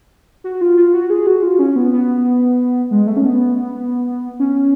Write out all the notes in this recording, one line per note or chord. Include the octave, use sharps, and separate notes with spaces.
F#4
F4
F4
F#4
G#4
F#4
F4
C#4
B3
B3
G#3
A3
C#4
B3
C#4